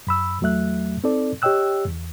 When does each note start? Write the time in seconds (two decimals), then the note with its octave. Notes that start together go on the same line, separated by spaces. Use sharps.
0.07 F#2 B5 E6
0.41 E2 F#3 A3 E5 F#6
1.04 C4 D#4 A4 D5
1.42 G4 C#5 D#5 G5 E6 F#6
1.86 E2